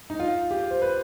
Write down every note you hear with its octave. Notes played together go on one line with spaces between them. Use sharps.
D#4
F4
G4
C5
B4